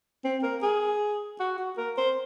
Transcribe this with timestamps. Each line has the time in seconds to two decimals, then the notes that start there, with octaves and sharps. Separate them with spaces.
0.25 C4
0.43 A#4
0.63 G#4
1.40 F#4
1.59 F#4
1.77 A#4
1.98 C5